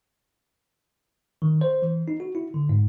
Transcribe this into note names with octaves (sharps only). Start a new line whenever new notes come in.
D#3
C5
E3
D#4
F#4
E4
D3
G#2